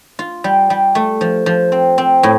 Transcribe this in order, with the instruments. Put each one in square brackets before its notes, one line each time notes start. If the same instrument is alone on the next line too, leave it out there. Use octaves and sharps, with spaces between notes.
[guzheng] F4
G3
G3
A3
F3
F3
C4
C4
A2